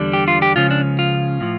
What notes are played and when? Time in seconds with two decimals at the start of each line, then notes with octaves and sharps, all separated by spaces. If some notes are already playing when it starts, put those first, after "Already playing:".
Already playing: E2 D3 G3 D4
0.13 G4
0.28 F4
0.42 G4
0.56 C#2 C#3 F3 C#4 F4
0.71 D4
0.99 F4
1.41 A2 F3